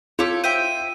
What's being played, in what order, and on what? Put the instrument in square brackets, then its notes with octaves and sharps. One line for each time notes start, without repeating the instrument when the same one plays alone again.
[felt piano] F4 [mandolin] G4 A4 C#5
[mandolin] C5 E5 G5 [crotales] D#7